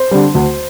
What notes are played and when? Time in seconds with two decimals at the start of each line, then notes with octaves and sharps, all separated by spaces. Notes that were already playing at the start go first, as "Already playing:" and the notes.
Already playing: C5
0.11 D3 G3
0.35 D2